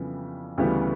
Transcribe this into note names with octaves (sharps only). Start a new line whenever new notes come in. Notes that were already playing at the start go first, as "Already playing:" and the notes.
Already playing: F2 C#3 E3 G3 B3
D2 C#3 E3 G3 B3